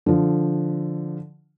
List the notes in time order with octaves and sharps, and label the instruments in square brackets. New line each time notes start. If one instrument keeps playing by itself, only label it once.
[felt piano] D3 F3